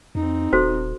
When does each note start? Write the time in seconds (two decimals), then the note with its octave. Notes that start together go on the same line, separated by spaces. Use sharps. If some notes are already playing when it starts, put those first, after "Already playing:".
0.15 F2 C4 D#4
0.53 D#1 F#4 A4 C5